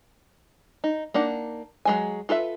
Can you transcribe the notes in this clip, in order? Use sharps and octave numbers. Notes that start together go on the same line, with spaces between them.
D#4
A#3 D4 D#4 F#5
F#3 G#3 G#5
F4 A4 B4 E5